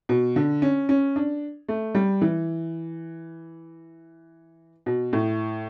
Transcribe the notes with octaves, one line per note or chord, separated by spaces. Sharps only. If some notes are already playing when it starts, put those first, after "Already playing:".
B2
D3
C#4
C#4
D4
A3
G3
E3
B2
A2